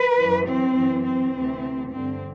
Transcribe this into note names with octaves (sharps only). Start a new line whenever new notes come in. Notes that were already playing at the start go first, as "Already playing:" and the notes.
Already playing: B4
F#2 E3
C4
F#2 E3
C4
D2 C3 E3
G2 D3 C4